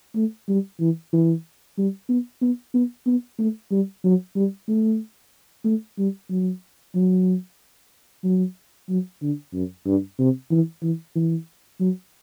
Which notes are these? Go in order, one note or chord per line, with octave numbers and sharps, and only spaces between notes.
A3
G3
E3
E3
G3
B3
B3
B3
B3
A3
G3
F#3
G3
A3
A3
G3
F#3
F#3
F#3
F#3
D3
F#2
G2
C3
E3
E3
E3
F#3